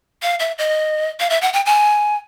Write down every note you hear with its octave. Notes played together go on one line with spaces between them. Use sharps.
F5
E5
D#5
F5
E5
F#5
G5
G#5